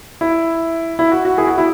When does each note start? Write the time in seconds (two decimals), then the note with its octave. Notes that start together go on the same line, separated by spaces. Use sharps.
0.21 E4
0.99 E4
1.12 F#4
1.25 F#4
1.38 E4 G#4
1.47 F#4
1.58 E4